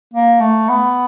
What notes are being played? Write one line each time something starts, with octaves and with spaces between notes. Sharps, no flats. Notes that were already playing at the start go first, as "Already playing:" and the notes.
A#3
A3
B3